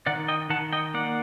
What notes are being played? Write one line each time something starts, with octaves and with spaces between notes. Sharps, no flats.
D#3 D5 F#5
D#5 G5
D#3 F#5 A5
D#5 G5
A#3 D5 F#5